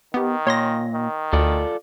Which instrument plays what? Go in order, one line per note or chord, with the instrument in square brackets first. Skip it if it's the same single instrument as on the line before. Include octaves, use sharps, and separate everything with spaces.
[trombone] D#3 [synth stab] B3 G4
[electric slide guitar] A#2 [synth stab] C#5 C6 A#6
[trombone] D#3
[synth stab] D2 [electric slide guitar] F4 A4 D5